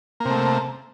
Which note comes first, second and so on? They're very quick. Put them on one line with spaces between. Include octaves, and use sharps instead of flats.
A#3 C3 A3